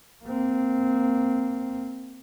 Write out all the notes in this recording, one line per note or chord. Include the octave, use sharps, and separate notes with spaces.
A#3 C4